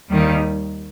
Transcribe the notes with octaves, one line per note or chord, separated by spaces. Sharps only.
D#2 D#3 G3